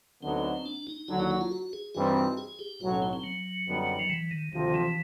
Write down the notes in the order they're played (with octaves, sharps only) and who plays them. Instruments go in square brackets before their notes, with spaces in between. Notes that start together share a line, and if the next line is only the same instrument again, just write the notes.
[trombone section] D2 D3 F#3 B3 D#4 [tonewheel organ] C4
[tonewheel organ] D4
D#4
[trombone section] D#2 D3 F#3 [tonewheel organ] E4
[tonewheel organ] D#4
E4
F4
F#4
G#4
[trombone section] G2 E3 G3 C4 D#4 [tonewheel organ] F#4
[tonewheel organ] G#4
G4
[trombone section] B1 A2 F#3 [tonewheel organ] F#4
[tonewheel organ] C#4
C4
C4
F#3
[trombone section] F#2 D3 G3 B3 D#4
[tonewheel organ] F3
E3
D#3
[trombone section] D2 C3 F3 [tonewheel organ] D#3
[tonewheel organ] E3